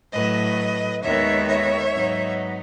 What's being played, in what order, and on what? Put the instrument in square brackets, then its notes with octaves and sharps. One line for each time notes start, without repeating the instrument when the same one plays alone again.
[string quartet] A2 F#3 A3 B4 D#5
D#2 D#3 G#3 B3 C#5 E5
C#5 E5
G#2 F#3 B3 D#4